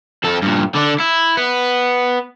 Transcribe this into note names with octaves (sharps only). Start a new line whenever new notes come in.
F2 A4
G2 A#2
D3 D4
E4
B3